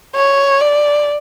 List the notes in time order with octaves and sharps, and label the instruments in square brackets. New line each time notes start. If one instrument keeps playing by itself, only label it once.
[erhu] C#5
D5